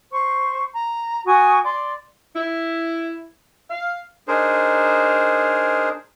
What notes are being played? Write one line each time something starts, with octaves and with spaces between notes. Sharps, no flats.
C5 C#6
A#5
F#4 G#5 C#6 D#6
D5 C6 D6
E4
F5
D4 D#4 G#4 A#4 C5